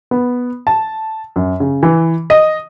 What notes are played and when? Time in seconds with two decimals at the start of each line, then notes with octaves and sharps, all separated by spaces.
0.11 B3
0.67 A5
1.36 F#2
1.60 C#3
1.83 E3
2.30 D#5